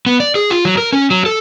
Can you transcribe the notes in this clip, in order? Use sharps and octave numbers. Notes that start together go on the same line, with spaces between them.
B3
D5
G#4
F4
F#3
A#4
C#4
F#3
A4